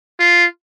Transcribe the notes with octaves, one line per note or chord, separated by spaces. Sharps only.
F4